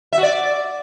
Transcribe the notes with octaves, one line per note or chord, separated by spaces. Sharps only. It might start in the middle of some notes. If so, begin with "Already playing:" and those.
E5
F#4
D5